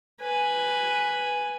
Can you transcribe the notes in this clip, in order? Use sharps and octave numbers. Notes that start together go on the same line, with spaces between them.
B4 G#5